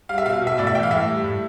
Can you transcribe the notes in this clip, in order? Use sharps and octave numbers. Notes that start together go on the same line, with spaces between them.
G3 F5
E5
B2 F5
B2
E5
A2 D5
E5
E3 G5
F5
A2 E5
G3
A2